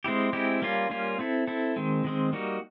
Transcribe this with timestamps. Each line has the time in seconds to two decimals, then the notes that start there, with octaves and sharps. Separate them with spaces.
0.04 G#3 C4 E4 G4
0.33 G#3 C4 E4 G4
0.62 G3 A#3 C#4 F4
0.90 G3 A#3 C#4 F4
1.19 C4 E4 A4
1.47 C4 E4 A4
1.76 D#3 G#3 C4
2.04 D#3 G#3 C4
2.33 G3 A#3 D#4 F#4